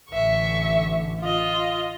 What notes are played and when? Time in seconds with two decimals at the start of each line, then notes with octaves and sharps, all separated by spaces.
0.10 A1 D3 E5 C#6
1.20 F4 D#5